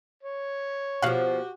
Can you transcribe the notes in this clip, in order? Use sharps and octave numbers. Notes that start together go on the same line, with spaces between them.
C#5
B2 F3 F#4 G4 F5 F#5